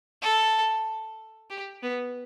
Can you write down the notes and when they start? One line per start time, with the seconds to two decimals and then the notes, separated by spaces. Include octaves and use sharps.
0.22 A4
1.50 G4
1.83 B3